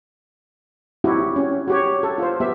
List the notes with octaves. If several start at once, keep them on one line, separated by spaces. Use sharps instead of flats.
C4 D#4 E4 F#4 G4
C#4
F#4 G4 C#5
A4
F4 C5
B3 G4 E5